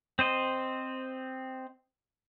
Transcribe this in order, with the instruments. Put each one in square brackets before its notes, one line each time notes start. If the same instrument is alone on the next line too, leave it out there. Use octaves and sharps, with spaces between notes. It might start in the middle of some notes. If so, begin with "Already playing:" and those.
[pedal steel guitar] C4 C5 D#5